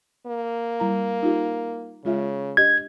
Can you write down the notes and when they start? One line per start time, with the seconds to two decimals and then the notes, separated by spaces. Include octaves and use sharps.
0.26 A#3
0.80 G3 E4 A#5
1.22 D#4 F4 G4
2.05 C#3 G#3 F4 E5
2.57 D4 G4 D#5 G#6